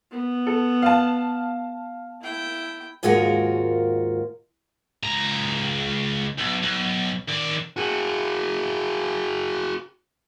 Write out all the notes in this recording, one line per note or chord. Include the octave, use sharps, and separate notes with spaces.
B3
A4
F5 A5
E4 G5
D#2 G#2 G#3 F4 F#4 A#4
C#2 A#5
B1
B1
D#3 D5
F#4 G#4